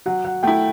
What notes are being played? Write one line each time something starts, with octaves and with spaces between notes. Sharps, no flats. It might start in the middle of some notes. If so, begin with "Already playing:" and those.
F#3 F#5
F#5
A3 E4 G5